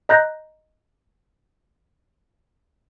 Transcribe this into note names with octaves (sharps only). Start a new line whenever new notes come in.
D#5 A#5 F#6 G6 A#6